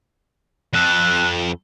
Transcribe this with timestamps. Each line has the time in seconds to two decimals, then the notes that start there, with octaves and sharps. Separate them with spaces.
0.73 F2 A4 F#6